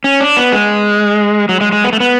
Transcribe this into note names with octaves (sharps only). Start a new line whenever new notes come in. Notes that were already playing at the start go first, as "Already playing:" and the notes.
C#4
D4
B3
G#3
F#3
G#3
G#3
B3
A3
B3